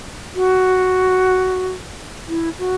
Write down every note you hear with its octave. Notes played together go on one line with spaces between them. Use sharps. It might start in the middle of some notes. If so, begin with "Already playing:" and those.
F#4
E4
F#4